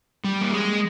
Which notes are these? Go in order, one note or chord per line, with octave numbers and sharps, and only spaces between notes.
G3
A#3
G#3